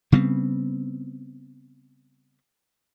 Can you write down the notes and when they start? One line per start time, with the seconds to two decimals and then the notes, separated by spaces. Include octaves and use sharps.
0.12 C#3 G3 B3 C4